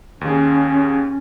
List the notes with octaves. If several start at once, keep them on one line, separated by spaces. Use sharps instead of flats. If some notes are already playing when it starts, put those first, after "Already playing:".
D#2 C#4 G#4